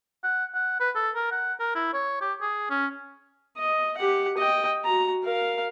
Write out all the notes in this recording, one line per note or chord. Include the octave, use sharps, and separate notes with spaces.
F#5
F#5
B4
A4
A#4
F#5
A#4
E4
C#5
G4
G#4
C#4
D#5
G4 F#5
D#5 G5
F#4 A#5
A#4 F5